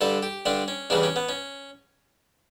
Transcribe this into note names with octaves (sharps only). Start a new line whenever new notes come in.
G2 D3 G3 A4
G4
G2 D3 G3 D4
C#4
E2 C#3 E3 G3 D4
C#4
B3
C#4